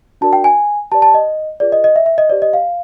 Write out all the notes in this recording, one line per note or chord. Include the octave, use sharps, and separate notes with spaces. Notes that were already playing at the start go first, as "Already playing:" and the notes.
D4 F#4 A#4 D5 A5
G5
G#5
G4 B4 D5 A5
A5
D#5
F4 G#4 B4 D5
D#5
D#5
E5
E5
D#5
G4 C5 D5
D#5
F5